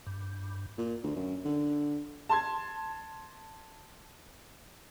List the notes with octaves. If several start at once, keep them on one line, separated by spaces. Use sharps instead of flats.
G2
A#2
D2
F#2
D3
A5 C6 G#6